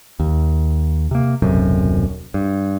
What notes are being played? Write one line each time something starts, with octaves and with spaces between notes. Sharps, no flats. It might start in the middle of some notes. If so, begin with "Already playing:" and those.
D#2
C3 A#3
D#1 B1 F#2 C3
G2